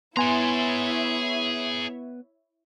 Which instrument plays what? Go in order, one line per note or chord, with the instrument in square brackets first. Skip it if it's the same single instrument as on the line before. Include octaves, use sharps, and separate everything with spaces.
[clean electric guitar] B3 [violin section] E4 C#5 E5 [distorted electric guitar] G#4 A#5 [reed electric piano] G#5 C6